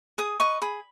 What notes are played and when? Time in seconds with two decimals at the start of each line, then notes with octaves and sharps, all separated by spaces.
0.18 G#4 D#6
0.40 B4 D#5 C#6
0.62 G#4 B5